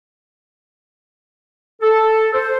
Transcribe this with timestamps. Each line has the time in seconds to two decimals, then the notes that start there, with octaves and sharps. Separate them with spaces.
1.81 A4
2.34 C5